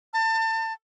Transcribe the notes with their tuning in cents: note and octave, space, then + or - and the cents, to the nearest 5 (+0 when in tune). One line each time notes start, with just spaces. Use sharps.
A5 +30